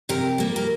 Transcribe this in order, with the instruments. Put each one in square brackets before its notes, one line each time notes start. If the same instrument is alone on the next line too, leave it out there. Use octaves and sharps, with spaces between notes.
[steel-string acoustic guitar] C3 G4 A#4
G3 A#3
A#4